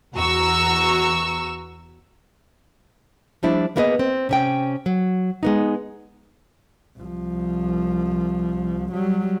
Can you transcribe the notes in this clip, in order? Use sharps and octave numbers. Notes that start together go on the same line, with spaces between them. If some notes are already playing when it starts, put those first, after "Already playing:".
E2 F#4 A#5 C#6 E6
F3 G3 A3 D4 E4
A#3 B3 E4 G#4 B4 D#5
C4
C3 C#4 G5
F#3
G#3 B3 D#4
C2 F3
F#3 G3